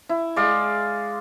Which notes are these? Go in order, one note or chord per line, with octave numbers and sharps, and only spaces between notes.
E4
G#3 D5 F5